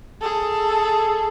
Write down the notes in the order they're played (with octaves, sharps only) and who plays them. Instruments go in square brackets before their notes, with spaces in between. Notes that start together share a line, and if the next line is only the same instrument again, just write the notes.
[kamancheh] G#4 A4